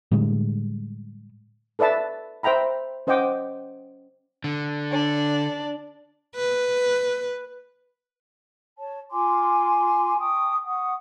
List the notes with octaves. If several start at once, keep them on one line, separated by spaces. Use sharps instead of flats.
A2 D3 G3 G#3
A4 B4 D5 E5 A5
C5 E5 G5 A#5 B5
C#4 C5 D#5 F#5 G5 D6
D3
D4 D5
B4
C#5 A5
F4 G#5 C6 D6
G5 A5 C#6 D#6
F#5 C#6 D#6